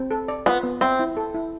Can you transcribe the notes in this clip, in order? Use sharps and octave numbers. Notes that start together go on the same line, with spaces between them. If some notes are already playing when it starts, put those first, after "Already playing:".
Already playing: C4
A4
D5
B3 F4
B3
C4 E5
E4
A4
E4